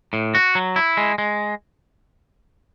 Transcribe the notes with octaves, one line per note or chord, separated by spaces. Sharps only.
A2
F#4
F#3
E4
G#3
G#3